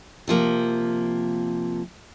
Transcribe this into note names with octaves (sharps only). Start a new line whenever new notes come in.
C3 F3 A#3